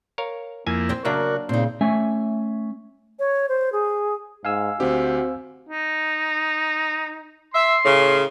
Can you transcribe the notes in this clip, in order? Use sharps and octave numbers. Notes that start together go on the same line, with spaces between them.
A#4 C#5 F5
F2 A#3 E4 G#5
C4 C5
C#3 F#3 A#3 D4 F#4 A#4 D5 E5
A#2 C#3 C4 D#4
A3 C#4 E5 G#5
C#5
C5
G#4
G#2 F5 G#5 E6
D2 C4 F#4 G4
D#4
E5 C6
A2 C#3